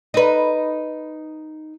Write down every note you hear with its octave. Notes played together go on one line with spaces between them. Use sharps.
D#4 B4